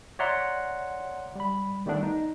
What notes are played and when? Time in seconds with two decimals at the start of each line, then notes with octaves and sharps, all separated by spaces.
0.19 C#5 D5 E5 F#5 A#5 C6
1.35 G3 B5
1.86 D#3 G3 A3 B3 D4
2.03 D#4